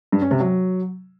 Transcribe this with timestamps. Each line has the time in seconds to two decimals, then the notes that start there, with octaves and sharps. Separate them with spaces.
0.12 G2
0.22 C#4
0.31 C3
0.40 F#3